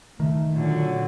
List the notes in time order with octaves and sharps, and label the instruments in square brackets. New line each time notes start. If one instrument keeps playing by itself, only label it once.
[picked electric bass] D#3 [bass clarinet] A3
[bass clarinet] A#2 [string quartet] D3 F#3